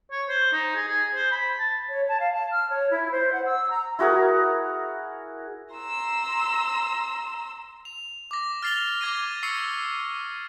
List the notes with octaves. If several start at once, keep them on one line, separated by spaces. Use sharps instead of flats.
C#5
C5
D#4
G#4
G#4
C5
B5
A5
C#5
A5
F5
A5
F6
C#5
E4
C5
F#5
E6
A#5
E4 F#4 G#4 A#4
A#5 C6 E6
F7
D6 A#6
F6 A6 C7 F7 G7
D6 G#6 A#6 D#7
C#6 E6 C7 C#7